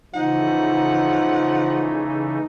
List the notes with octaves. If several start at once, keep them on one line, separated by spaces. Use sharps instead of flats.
C#3 E3 F3 A3 D#4 F#5